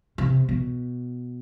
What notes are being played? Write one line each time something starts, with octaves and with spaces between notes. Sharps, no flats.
C3
B2